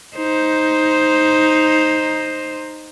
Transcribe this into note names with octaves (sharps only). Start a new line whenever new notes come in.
D#4 C5